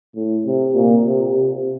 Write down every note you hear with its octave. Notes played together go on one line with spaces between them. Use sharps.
A2
C3
A#2
C3
C3